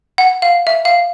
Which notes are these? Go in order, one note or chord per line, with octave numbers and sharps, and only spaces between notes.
F#5
F5
E5
F5